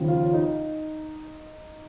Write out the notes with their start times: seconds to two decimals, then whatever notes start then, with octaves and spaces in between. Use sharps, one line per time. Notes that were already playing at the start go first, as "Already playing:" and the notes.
Already playing: D#2 C#3 F3
0.08 F4
0.34 D#4